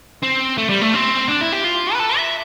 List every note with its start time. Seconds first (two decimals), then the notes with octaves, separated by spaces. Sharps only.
0.23 C4
0.58 A3
0.69 G3
0.81 A3
0.94 C4
1.28 D4
1.41 E4
1.52 G4
1.64 F4
1.93 B4
1.99 A4
2.17 E5